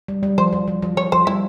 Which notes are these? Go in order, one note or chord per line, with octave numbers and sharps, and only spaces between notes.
G3
G3
F3 C5
F3
F3
F3
F3 C#5
F3 C5
G3 E4